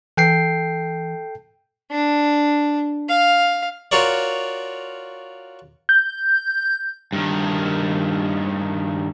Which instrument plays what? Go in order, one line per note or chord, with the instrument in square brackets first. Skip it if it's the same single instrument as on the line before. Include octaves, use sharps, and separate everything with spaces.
[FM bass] E3 [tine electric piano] A4 G5 C7
[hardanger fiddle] D4
F5
[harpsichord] F4 F#4 A#4 C#5 D5
[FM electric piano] G6
[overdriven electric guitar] G2 D#3